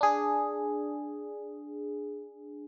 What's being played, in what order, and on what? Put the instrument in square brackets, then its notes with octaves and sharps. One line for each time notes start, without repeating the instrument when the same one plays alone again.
[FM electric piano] D4 G#4